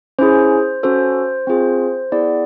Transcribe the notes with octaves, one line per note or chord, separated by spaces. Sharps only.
C#4 E4 G#4 C5
C#4 F#4 A4 C5
C4 F4 G#4
B3 E4 G#4 D5